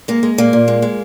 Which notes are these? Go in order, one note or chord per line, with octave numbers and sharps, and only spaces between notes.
G#3 A#3
G#3
A#2 A#3
A#2
G#3
G#3